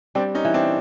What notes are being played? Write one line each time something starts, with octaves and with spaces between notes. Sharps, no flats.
G3 C4 D4
C#4 D#4
E3
C4 D4